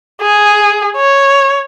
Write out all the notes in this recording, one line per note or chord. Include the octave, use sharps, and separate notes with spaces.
G#4
C#5